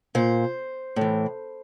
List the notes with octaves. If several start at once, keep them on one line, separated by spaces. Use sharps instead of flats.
A#2 C5
A2 E3